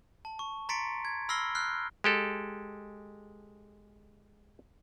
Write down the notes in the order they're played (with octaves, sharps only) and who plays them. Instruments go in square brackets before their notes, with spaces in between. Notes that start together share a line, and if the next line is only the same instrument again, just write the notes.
[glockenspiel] A5
C#6
A#5 C6 A6 B6 C#7 D7
G#6
B5 E6 F6 A#6 C7 G7
F6 F#6 C7
[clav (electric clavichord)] G#3 G4 A4